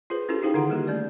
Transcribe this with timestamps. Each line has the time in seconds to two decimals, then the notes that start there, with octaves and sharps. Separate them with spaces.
0.10 F4 G#4 B4 C5
0.29 C#4 E4 F4 G4 A4
0.42 D#4 F#4 G#4 C5 F5 G5
0.54 D3 D#3 F4 G#4 F#5 C6
0.70 G3 A#3 G4
0.87 A3 C#4 D5